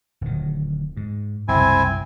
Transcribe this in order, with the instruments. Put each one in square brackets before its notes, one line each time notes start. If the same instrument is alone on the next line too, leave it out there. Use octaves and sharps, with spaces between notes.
[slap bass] D1 D#3
G#2
[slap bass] F#1 C2 [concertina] C4 E4 G#5